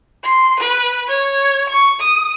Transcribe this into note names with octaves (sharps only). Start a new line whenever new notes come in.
C6
B4
C#5
C#6
D#6